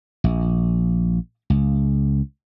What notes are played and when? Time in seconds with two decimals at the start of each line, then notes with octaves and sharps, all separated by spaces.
0.24 A#1
1.50 C#2